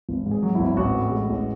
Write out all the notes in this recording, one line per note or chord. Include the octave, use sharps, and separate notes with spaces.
G#1
G#2
G#4
F#3
G#1 E4
A1 F#4
A2
G#3
A1